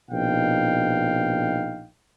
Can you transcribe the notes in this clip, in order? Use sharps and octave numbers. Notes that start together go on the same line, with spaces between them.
A#1 B2 D#4 F5 G5